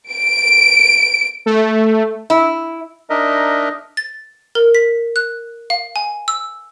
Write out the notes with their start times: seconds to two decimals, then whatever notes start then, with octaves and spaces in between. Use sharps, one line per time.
0.12 D7
1.46 A3
2.30 E4
3.10 D4 D#4 A#4 D#5 E5
3.97 A6
4.55 A#4
4.75 B6
5.16 F#6
5.70 F5
5.96 G#5
6.28 E6